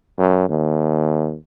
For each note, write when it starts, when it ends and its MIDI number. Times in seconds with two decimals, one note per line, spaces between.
0.18 0.45 42
0.49 1.36 39